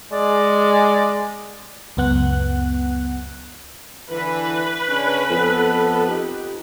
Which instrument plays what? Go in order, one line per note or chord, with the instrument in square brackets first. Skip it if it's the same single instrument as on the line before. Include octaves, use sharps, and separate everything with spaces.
[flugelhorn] G#3 [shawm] D5
[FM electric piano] C#2 F#2 B3 F#5 F#6
[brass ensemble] D3 E3 [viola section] B4
[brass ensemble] C#3 C#4 D4
[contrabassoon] F2 [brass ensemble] B3 A4
[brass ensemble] D#4 G4